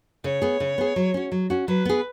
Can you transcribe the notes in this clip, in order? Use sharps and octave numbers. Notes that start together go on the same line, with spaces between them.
C#3 C#5
B3 G#4
C#3
B3 G#4
F#3
C#4 F#4
F#3
C#4 F#4
F#3 B4
B3 G#4